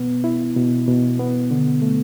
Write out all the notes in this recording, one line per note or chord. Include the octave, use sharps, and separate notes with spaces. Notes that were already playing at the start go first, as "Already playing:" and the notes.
Already playing: B2 B3
E4
B2
B2
B3
D3
A3